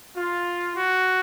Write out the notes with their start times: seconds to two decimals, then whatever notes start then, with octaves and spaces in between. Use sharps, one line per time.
0.16 F4
0.77 F#4